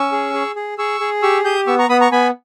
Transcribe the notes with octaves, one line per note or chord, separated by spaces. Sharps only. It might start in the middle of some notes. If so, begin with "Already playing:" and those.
Already playing: C#4 C#6 E6
G#4
G#4
G#4
G#4 C#6 E6
G#4
G4 C#6 E6
G4 D#6 G6
B3 C#6 E6
A#5 C#6
B3 B5 D#6
A#5 C#6
B3 G#5 B5